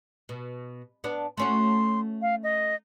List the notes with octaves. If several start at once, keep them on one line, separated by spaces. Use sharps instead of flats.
B2
B3 D4
A3 C#4 F#4 C6
F5
D#5